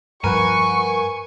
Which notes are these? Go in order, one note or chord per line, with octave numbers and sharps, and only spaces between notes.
G2 F3 A#4 B4 F#5 G#5 C#6